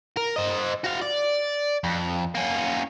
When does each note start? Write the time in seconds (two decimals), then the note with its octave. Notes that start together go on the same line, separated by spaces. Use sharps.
0.17 A#4
0.36 C5 D#5
0.84 F#4 F5
1.03 D5
1.84 F2
2.35 A#3 C#4